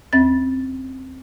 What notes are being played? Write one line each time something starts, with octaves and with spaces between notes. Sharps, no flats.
D#2 C4 A6